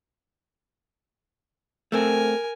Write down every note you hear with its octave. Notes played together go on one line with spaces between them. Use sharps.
A3 C4 A#4 G#5